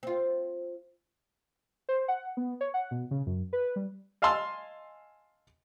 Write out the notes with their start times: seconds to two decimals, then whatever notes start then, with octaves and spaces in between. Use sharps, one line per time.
0.03 C4 F4
1.89 C5
2.08 F#5
2.37 B3
2.61 C#5
2.74 F#5
2.91 B2
3.11 C#3
3.26 F#2
3.53 B4
3.76 G3
4.22 D#5 F5 G#5 A5 C6 E6